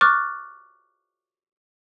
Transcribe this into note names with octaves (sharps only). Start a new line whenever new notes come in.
C#6 D6 F6 F#6 A6